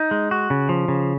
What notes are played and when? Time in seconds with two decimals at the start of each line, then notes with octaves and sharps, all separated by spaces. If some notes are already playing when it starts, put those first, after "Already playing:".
Already playing: D#4
0.11 G#3
0.31 F#4
0.50 C#3
0.69 F3
0.88 C#3